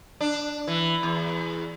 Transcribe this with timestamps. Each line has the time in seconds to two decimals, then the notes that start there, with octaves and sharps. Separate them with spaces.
0.21 D4
0.67 E3
1.03 E2